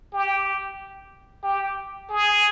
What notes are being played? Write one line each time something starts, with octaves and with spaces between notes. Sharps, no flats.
G4
G4
G#4